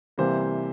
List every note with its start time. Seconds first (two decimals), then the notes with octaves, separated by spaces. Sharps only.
0.18 C3 E3 G3 A#3 C5